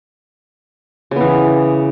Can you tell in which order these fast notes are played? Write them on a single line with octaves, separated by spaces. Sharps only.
C#3 B3 E3